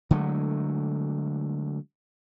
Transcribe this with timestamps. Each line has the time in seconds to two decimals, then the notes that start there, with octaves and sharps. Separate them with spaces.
0.11 D3 F#3 G#3 A3